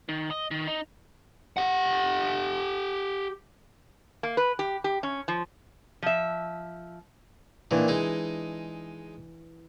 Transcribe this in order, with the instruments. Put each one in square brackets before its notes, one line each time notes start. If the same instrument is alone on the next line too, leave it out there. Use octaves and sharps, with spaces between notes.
[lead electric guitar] D#3
D#5
D#3
D#4
G4 F#5
[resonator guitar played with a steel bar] A#3
B4
G4
G4
C#4
F3
F3 E5
[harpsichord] A#2 D#3 [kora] E3 D4
[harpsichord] G#3 D#4